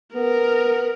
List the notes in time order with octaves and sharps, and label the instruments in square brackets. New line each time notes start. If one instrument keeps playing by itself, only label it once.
[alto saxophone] B3 [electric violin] A#4